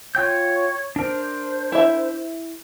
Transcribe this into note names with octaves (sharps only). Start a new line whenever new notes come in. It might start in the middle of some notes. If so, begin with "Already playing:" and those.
F4 C#5 G5 G6
D4 A#4 C5
E4 E5